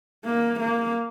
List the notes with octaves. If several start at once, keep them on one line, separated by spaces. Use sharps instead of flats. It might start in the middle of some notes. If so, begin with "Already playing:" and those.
A#3
A#3